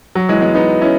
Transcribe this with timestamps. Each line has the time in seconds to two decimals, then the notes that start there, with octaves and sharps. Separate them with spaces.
0.15 F#3
0.29 E3 G#3
0.41 G#3 B3
0.55 B3 D#4
0.81 C#4 E4